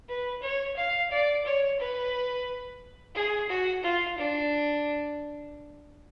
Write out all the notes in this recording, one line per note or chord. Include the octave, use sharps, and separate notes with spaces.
B4
C#5
F5
D5
C#5
B4
G#4
F#4
F4
D4